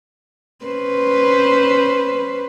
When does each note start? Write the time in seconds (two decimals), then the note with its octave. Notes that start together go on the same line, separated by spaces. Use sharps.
0.65 C#4 B4 C5